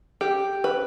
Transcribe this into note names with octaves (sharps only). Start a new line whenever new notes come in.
G4
B4